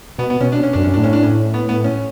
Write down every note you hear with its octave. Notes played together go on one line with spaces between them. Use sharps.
B2 B3
B3
B2 C#4
D4
C#4
F#2 D4
F#2 C#4
A2 D4
C#4
D4
C#4
B3
B3
C#4